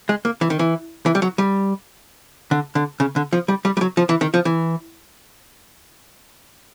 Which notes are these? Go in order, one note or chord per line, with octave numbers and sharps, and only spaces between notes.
G#3
A#3
E3
D#3
E3
E3
G3
F#3
G3
D3
D3
C#3
D3
F3
G3
G3
G3
F#3
F3
E3
D#3
F3
E3